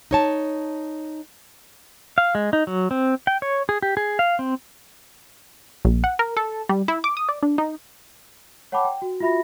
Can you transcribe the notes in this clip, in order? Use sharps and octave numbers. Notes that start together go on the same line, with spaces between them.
D#4 C#5 A5
F5
G#3
D#4
F#3
C4
G5
C#5
G#4
G4
G#4
F5
C4
A#1
F#5
A#4
A4
G3
E4
D6
D#6
D5
D4
D#4
C#5 F#5 G5 A5 B5 D6
G5
F#4
F4 F#4 E5 B5 A#6